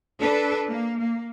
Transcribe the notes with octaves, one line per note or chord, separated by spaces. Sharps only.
D4 A4 B4
A#3
A#3